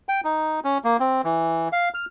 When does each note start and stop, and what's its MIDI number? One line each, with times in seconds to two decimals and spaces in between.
0.09 0.21 79
0.24 0.60 63
0.64 0.78 61
0.84 0.97 58
1.00 1.22 60
1.24 1.68 52
1.72 1.89 77
1.94 2.05 89